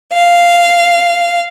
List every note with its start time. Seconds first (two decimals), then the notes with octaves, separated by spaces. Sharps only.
0.13 F5